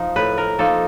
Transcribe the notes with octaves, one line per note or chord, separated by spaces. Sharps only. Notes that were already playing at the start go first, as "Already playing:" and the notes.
Already playing: F3 D#4
A2 B4
A#4
F3 A#3 D#4 A4